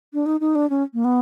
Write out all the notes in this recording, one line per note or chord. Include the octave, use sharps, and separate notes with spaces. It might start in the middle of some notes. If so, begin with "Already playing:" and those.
D4
D#4
D#4
D4
C#4
A#3
B3